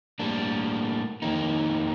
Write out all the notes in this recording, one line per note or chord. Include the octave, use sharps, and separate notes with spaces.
A2 G3 A#3 D4
F2 D#3 A#3 D#4